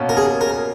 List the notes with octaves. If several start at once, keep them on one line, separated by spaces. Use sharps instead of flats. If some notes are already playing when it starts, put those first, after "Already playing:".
Already playing: B2 A#3 C#4
A#4
G#4
A#4